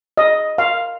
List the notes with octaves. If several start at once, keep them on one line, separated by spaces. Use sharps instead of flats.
D#5
F5